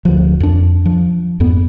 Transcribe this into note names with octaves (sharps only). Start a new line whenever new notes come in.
D2 F3
F2 D4
F3
F2 G#2 B3